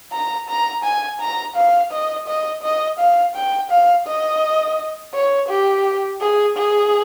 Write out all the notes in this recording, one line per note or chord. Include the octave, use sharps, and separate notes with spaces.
A#5
A#5
G#5
A#5
F5
D#5
D#5
D#5
F5
G5
F5
D#5
C#5
G4
G#4
G#4